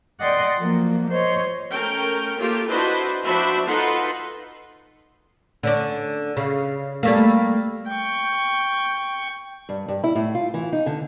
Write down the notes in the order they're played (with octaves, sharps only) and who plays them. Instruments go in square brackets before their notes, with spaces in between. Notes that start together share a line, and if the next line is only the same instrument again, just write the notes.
[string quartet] D5 D#5 F#5 G5 C6
F3 F#3 A#3
C5 C#5 D#5 C6
[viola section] A3 C#4 A#4 G5
A3 A#3 F4 G4
D4 E4 F#4 B4 C5 D#5
F3 D4 F#4 C5 E5 B5
D#4 F4 A4 B4 F#5 C6
[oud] D3 C#4 D4
C#3
G3 A3 A#3
[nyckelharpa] G5 C#6
[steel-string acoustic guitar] G2
G2
E4
A2
F4
E3
D#4
D3